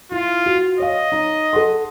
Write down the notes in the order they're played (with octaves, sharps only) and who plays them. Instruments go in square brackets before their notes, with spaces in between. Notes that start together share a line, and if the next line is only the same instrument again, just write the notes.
[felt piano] E4 [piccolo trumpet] F4
[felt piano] F#4
[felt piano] C#5 F5 [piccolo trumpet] D#5
[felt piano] D#4
A4 F#5 C6